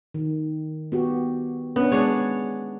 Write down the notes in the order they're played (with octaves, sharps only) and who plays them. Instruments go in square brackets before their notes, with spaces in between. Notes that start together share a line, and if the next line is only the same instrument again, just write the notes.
[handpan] D#3
B3 F#4 G4
[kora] B3 [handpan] C#4 D4
[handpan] G#3 [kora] D4 G#4 C#5